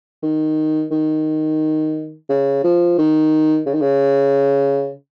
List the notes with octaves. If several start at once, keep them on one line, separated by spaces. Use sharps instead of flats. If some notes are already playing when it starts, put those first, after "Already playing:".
D#3
D#3
C#3
F3
D#3
C#3
D#3
C#3